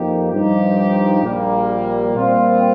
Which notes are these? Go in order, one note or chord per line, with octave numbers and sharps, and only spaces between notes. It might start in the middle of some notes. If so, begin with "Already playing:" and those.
Already playing: F2 F3 A#3 D#4 G4
G2 F3 D#4 G4
A#1 A#2 G3 A#3
A#2 G3 C4 F4